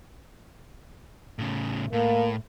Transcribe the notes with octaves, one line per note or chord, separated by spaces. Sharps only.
A2 C#3
A2 A#3